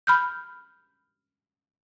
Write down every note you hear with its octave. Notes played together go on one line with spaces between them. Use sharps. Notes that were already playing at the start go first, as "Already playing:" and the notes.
B5 F6 G6